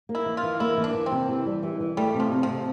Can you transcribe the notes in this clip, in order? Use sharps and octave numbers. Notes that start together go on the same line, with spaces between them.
A#3
E4
E3
F4
E3
A#3 E4
E3
D4
E3
C4
C3
E3
G3
E3
E3
G3 A3
C3
F3
C3
F3
C3